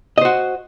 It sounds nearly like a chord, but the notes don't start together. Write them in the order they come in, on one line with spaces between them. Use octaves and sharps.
D#5 C5 F#4